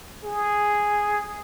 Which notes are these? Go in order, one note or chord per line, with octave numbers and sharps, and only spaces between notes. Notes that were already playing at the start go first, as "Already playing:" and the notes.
G#4